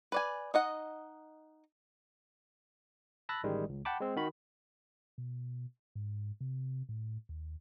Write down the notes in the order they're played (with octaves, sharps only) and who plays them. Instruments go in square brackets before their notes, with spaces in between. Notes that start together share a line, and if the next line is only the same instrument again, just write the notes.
[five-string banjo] B4 D5 G#5
D#4 D#5 F#5
[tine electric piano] A5 B5 E6 F#6 A6 A#6
A1 D#3 G3 G#3
C#2
F#5 G5 A5 B5 D6
G#3 C4
D#3 F#4 B5
[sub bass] B2
G#2
C3
A2
D#2